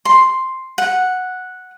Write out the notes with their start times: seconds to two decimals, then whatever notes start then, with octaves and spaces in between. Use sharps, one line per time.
0.05 C6
0.78 F#5